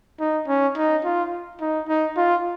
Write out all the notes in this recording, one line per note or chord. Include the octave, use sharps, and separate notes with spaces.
D#4
C#4
D#4
F4
D#4
D#4
F4